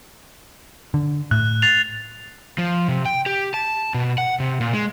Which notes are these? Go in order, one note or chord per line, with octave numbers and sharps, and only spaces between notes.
D3
A2 F#6
A6 C7 F7
F3
C3
G5
G4
A5
B2
F#5
C3
A#2
G#3